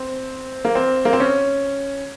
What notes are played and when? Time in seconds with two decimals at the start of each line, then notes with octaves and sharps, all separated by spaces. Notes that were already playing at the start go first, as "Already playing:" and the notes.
Already playing: C4
0.65 A#3
0.75 C4
1.05 A#3
1.13 C4
1.20 C#4